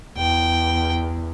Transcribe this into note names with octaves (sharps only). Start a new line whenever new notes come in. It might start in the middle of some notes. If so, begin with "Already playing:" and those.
E2 G5